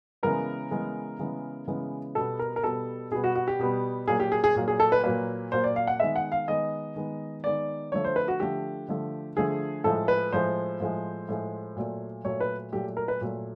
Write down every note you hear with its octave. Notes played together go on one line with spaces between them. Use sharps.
C#3 E3 G#3 B3 A#4
C#3 E3 G#3 B3
C#3 E3 G#3 B3
C#3 E3 G#3 B3
B2 G3 B3 A4
A#4
A#4
B2 G3 B3 A4
B2 G3 B3 G#4
F#4
F#4
G4
B2 G3 B3
A#2 F#3 A#3 G#4
G4
G#4
G#4
A#2 F#3 A#3
G#4
A4
B4
A#2 F#3 A#3 B4
A#2 F#3 A#3 C5
D5
F5
F#5
D#3 G#3 B3 E5
F#5
F5
D#3 G#3 B3 D#5
D#3 G#3 B3
D#3 G#3 B3 D5
D3 F3 A3 C#5
C5
B4
F#4
D3 F3 A3 G4
D3 F3 A3
D3 F3 A3 G#4
A2 F3 G#3 A4
B4
A2 F3 G#3 C5
A2 F3 G#3
A2 F3 G#3
A#2 F#3 A3
A#2 F#3 A3 C#5
B4
A#2 F#3 A3 G4
A#4
B4
A#2 F#3 A3